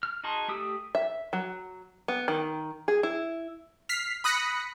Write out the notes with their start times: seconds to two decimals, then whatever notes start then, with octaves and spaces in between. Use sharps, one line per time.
0.03 F6
0.24 D#4 F#4 G#4 A5 C6
0.48 A3 G4 D#6 E6
0.95 E5
1.33 F#3
2.08 B3
2.28 D#3
2.88 G#4
3.03 E4
3.89 F6 B6 C7
4.24 B5 D#6 F#6 A#6 B6 C#7